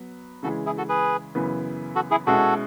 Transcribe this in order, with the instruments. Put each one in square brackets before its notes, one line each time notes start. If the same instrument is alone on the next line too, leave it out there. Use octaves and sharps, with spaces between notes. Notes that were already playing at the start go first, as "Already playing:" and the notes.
Already playing: [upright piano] F#3 B3
[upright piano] C#3 E3 G#3 [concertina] F#4 A4
[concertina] E4 G#4
F#4 A4
G#4 B4
[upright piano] F#2 C#3 E3 B3
[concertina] F#4 A4
E4 G#4
[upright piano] B2 G#3 C#4 E4 [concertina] F#4 A4